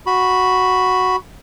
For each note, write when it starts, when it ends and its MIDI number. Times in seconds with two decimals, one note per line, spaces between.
0.06 1.16 66
0.06 1.16 83